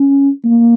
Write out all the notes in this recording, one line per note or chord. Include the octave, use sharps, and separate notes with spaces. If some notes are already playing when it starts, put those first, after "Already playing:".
Already playing: C#4
A#3